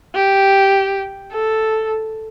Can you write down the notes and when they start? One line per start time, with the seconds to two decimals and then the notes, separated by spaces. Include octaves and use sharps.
0.15 G4
1.33 A4